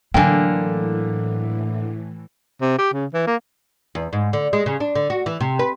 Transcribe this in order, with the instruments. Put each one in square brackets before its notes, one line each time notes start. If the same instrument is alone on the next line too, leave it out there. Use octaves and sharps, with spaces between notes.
[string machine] A2 E3 [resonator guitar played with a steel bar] D3 A#3 [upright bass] F#3 E4 [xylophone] G5 G#5
[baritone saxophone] C3
G4
C#3
E3
A#3
[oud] E2
G#2
D3
G#3
C#3
D4
D3
F#4
E3
C3
B4